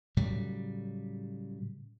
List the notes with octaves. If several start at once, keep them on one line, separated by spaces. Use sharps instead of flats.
A2 C#3 F#3 G3